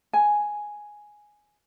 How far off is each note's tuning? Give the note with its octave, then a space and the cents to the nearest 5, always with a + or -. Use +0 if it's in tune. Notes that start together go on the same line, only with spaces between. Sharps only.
G#5 +5